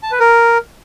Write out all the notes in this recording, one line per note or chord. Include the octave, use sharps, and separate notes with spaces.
A5
B4
A#4